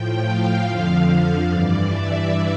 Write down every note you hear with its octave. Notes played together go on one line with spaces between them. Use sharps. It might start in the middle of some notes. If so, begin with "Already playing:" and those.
Already playing: A2 F3 G5
F5
F2 D3 F3
F5
G2 E3 D5
E5